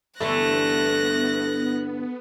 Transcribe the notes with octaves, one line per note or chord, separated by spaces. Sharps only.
G2 D3 E3 A3 B3 F#6 A#6